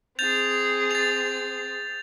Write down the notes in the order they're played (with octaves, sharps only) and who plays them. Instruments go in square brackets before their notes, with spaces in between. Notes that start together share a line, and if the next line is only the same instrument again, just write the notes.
[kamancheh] C4 G#4 [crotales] G6 A6 F7
[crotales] A6 F7